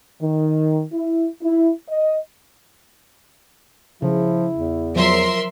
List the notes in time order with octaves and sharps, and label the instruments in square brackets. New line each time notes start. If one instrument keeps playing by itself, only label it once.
[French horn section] D#3
E4
E4
D#5
[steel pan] C#3 [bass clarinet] F3 [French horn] E4
[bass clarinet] E2
[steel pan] F3 F#3 [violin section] A#4 E5 C6